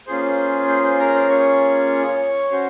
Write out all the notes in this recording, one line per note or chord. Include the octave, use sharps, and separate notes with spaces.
A#3 C#4 F4 G#4 C5 C6
C5 C6
C5 C6
A#4 A#5
C5 C6
C#5 C#6
C#4 F#4 C5 C6